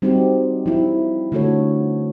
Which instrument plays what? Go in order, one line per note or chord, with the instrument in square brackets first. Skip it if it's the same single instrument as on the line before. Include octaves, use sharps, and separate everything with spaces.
[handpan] G3 C4 D#4 F#4 G4
F3 E4
D3 F3 A3 F#4 A4 C#5